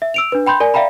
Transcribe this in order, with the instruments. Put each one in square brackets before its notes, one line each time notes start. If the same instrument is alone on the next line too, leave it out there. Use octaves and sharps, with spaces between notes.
[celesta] E5
E6 D7 F7
D4 B4
G5 B5 C6 G6
A#4 D5 G#5
D5 E5 F5 G5 A#5 B5